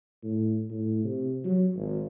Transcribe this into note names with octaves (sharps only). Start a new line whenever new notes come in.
A2
A2
C3
F#3
G#1